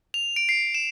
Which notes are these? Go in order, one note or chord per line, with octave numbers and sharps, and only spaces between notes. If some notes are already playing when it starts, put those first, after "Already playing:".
F7
D7
C7
E7